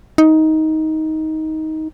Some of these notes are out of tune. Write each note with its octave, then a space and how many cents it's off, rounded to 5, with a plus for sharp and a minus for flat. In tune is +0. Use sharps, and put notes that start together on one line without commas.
D#4 +15